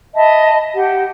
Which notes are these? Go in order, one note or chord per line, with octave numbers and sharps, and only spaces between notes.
D#5 E5 A5 B5
G4 F#5